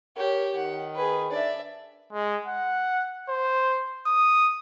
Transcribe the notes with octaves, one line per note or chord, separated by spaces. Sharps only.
G4 A#4 C#5
D#3 F#5
G#4 B4
D4 D5 E5
G#3
F#5
C5
D#6